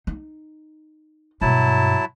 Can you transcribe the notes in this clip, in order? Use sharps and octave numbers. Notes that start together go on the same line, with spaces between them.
D#4
G2 B2 F#3 E4 A5